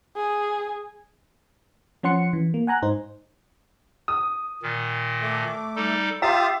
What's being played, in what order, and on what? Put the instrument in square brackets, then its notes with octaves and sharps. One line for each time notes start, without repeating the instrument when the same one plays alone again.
[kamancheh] G#4
[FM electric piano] F3 C#4 F#5 C6 C#7
E3
A#3
F#5 G#5 A#5 F#6
G#2 D#4 C5
[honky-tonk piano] D#6
[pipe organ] A#2 D#3
[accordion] A3 D6
[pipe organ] G3 D#4 A4
[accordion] F4 G4 [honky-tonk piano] E5 [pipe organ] F5 D#6 A6